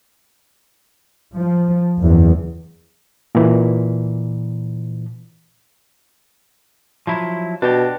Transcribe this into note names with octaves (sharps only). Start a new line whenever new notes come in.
F3
F#1 E2
A#2 E3
F3 F#3 E4
B2 D4 F#4 G4